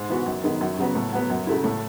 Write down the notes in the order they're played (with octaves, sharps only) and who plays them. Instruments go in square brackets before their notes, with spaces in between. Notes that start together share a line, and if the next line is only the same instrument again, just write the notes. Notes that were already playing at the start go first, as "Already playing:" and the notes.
Already playing: [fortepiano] G#2
E3 B3 F#4
F#2
D#3 G#3 B3
F#2
C#3 F#3 B3
A2
F#3 B3
F#2
C#3 F#3 A3 E4
A2